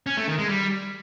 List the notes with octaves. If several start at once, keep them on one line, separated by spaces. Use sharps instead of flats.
C#4
A3
D#3
G#3
G3